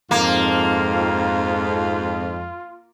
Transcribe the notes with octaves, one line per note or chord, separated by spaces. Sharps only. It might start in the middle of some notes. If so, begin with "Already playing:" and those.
F2 G#2 A#3 F4